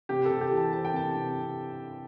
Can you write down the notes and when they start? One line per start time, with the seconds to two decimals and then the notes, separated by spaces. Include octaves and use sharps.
0.09 C3 G4
0.25 A4
0.30 C3
0.41 G4
0.51 E3
0.57 A5
0.73 C4 A5
0.85 G5
0.94 C3 A5
1.16 C3